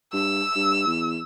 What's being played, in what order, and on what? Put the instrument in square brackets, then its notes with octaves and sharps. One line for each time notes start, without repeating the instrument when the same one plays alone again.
[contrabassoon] G2 [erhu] E6
[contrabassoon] G2
E2